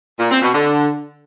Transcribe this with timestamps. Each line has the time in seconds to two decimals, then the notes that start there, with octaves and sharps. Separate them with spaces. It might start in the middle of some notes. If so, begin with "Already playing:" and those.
0.19 A#2
0.31 C4
0.42 B2
0.54 D3